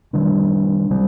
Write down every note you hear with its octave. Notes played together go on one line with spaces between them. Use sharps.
C3 D#3 G3 D4
C3 G3